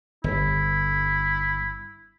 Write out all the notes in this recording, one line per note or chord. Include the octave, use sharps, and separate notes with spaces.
G1 E4